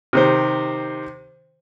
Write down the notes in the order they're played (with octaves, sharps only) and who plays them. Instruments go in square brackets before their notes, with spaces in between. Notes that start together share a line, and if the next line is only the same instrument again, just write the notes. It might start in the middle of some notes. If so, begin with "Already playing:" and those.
[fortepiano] C3 D#3 C5